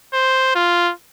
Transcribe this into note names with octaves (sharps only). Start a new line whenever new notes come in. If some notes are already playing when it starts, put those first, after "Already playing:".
C5
F4